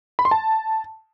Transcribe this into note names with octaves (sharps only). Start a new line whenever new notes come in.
B5
C6
A5